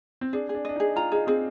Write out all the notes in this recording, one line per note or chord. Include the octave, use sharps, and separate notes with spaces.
C4
D4 G#4
G#4
D4
D4 D#5
D#4 G#4
F4 A#5
D#4 G#4
C4 G#4